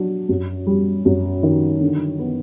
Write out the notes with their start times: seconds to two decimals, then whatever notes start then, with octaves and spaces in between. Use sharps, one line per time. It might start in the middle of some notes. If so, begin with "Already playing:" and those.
Already playing: F#3 D4
0.29 F#2
0.67 G3
1.05 F#2
1.43 D#3
1.81 D3
2.19 B3